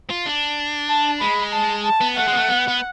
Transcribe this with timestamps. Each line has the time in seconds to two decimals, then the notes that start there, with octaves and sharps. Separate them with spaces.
0.10 F4
0.26 D4
0.89 A5
1.21 G#3 B5
1.53 A5
1.85 A5
2.01 B3
2.16 A3 F#5
2.27 G#3
2.33 B3
2.37 A3
2.48 B3
2.68 B3